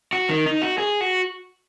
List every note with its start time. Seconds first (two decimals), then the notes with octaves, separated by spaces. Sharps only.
0.13 F#4
0.29 D#3
0.46 D#4
0.62 F#4
0.78 G#4
1.01 F#4